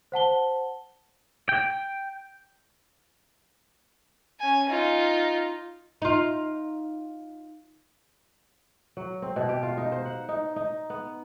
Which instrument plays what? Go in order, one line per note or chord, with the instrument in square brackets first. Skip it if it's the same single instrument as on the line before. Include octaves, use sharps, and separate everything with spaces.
[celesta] C5 F#5 A5 G7
[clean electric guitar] G5
[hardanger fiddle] C#4 G#5
D#4 F4
[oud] D#4 F4
[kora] F#3
C4
B2
G4
F4
D#4
C5
F#5
D#4
D#4
B3